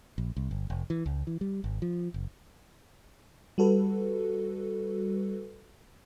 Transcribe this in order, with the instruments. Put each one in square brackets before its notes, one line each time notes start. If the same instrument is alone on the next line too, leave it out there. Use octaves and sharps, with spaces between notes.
[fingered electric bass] A#1
C2
G1
F1
E3
C#2
E3
G3
G#1
F3
F#1
[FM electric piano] G3 F#4 A4 B4